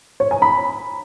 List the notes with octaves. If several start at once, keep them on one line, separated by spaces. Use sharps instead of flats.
C#5
G#5
B5